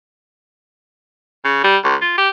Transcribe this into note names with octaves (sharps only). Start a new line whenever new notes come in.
C#3
G3
C#2
F4
G4